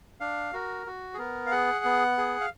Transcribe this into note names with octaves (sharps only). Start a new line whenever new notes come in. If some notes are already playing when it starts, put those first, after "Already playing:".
D4 F5
F#4 A#4
F#4
G#4
B3 A#4
F5
G#4 F#5
B3
G#4
F5